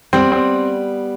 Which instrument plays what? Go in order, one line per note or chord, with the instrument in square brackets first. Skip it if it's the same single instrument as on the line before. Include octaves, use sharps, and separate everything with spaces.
[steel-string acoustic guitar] G3 B3 [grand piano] C4
[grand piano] C4